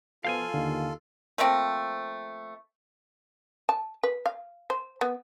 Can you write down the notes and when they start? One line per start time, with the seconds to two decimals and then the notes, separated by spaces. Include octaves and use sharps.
0.25 B2 F3 F4 A4 F5 G5 G#5
0.54 D#2 D3
1.38 F3 A3 A#3 C4
3.69 A5
4.03 B4
4.26 F5
4.70 C5
5.01 B3